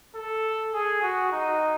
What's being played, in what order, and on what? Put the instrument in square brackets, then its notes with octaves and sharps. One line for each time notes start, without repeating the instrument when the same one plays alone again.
[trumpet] A4
G#4
F#4
D#4